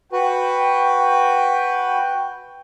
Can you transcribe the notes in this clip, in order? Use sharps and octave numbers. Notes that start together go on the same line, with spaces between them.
F#4 B4 G5